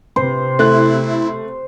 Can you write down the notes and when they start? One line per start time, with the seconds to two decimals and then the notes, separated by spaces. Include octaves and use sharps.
0.16 C3 C5
0.59 A3 E4 F#6